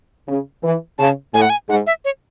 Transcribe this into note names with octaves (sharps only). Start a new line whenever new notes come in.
C#3
E3
C#3 A5
A2 G#5
F#5
G#5
G#2 F#5
E5
C#5